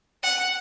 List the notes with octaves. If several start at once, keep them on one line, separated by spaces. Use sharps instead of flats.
F#5